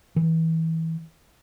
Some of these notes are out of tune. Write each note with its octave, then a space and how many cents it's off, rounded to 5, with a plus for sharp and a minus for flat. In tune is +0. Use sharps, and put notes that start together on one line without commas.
E3 -25